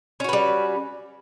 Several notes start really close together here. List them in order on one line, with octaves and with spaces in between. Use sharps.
C#4 F#4 B4 G3